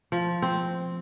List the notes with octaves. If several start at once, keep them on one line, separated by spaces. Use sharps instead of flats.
F3
C4